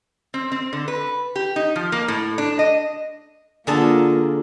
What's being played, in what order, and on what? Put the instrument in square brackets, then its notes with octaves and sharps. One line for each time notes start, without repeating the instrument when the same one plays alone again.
[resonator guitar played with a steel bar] C4
C4
D3
B4
G4
D#4
F3
A#3
A2
D4
D#5
[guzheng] D3 G#4 A5 [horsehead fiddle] A#3 F4